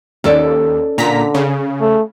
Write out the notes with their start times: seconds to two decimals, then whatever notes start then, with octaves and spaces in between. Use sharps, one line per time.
0.24 D#2 C#4 A4 D5
0.98 A#2 D3 A#5 B6
1.34 C#3
1.81 A3